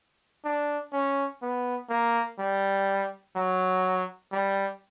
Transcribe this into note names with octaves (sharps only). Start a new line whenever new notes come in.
D4
C#4
B3
A#3
G3
F#3
G3